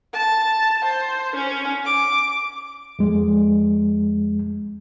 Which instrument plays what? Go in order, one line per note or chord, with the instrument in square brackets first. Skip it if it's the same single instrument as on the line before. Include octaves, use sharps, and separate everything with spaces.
[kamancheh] A5
C5
C#4
D6
[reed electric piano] F2 G#3